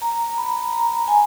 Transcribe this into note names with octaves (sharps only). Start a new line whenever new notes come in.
A#5
B5
A#5
G#5